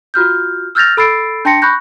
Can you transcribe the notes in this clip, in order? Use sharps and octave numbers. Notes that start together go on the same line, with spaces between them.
F4 F#4 F6 G6
E6 F6 G6 A6 A#6 F7
A4 B5 E6 A6 C7 D7
D4 G5 A5 C6 A#6 C#7
B5 C#6 F#6 G6 A#6